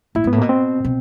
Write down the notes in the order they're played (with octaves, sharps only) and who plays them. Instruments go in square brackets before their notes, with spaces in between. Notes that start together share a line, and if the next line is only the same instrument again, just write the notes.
[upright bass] A2 [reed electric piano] E4
[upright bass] G#2
[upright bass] A2 [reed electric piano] B3
[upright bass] B2 [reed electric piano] A#3
[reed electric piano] C4
[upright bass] B2